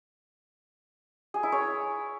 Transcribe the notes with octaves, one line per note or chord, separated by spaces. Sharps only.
G#4
E4
C#5